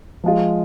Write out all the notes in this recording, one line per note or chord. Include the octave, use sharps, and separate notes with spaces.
F3 G#3 F4